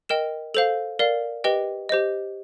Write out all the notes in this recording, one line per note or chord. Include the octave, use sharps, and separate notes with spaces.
A#4 D#5 G5 E7
A4 C5 F5 F7
A#4 D5 F5
G4 B4 D#5 G5 G7
G4 C5 D#5